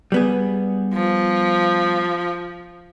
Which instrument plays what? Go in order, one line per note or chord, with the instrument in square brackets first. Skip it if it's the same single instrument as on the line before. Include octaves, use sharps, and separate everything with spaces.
[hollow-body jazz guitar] G3 B3 G#4
[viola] F3